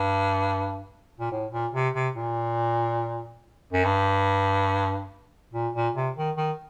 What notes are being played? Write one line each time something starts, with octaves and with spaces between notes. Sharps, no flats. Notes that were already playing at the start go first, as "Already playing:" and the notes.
Already playing: G2
A#2
A2
A#2
C3
C3
A#2
F#2
G2
A#2
A#2
C3
D#3
D#3